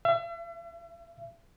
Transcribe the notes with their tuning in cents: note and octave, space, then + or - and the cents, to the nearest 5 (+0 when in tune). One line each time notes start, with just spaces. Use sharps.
E5 +40